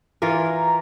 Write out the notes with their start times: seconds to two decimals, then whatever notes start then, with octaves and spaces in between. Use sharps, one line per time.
0.22 E3 F4 A#4
0.53 A#5